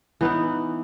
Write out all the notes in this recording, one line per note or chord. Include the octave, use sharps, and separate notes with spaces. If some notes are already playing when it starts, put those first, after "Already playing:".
E3 B3 D#4 E4